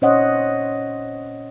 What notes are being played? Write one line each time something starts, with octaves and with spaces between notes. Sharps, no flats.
A#2 C#4 C5 C#5 D#5 F#5